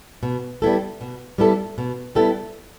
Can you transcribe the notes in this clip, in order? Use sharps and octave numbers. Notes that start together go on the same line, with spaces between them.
B2
G3 B3 E4 A4
B2
G3 B3 E4 A4
B2
G3 B3 E4 A4